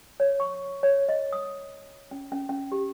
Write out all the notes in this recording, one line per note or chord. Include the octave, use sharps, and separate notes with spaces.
C#5
C#6
C#5
D#5
D#6
C#4
C#4
C#4
G4